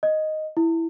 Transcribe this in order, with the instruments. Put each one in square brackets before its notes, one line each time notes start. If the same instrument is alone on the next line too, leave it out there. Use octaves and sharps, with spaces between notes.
[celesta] D#5
E4